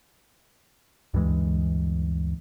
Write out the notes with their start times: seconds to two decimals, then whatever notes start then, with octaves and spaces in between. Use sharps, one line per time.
1.14 D2 G2 E3 G#3